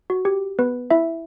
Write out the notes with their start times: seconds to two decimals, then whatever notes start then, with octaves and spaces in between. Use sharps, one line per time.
0.10 F#4
0.25 G4
0.59 B3 B4
0.91 E4 E5